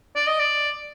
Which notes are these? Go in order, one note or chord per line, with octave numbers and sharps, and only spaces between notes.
D5
D#5
D5